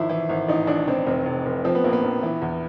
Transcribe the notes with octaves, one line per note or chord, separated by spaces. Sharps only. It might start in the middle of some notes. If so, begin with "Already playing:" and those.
Already playing: G#1 F3 E4
E3
G#1
A1 D#4
A1 D4
A1 C4
F1 C4
F1
F1
F3 C4
B3
A#1 A#3
B3
A#1
E3
E2